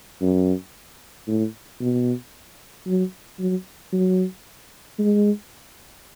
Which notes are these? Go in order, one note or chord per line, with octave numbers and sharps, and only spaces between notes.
F#2
A2
B2
F#3
F#3
F#3
G#3